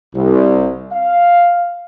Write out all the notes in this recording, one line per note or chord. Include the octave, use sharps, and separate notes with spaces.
C2
F5